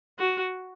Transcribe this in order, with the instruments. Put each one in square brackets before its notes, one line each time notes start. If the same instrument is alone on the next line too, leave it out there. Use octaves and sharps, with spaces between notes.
[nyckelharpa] F#4